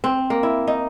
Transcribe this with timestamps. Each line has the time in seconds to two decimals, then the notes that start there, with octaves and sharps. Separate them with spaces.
0.04 C4
0.30 A#3
0.43 E4
0.67 D#4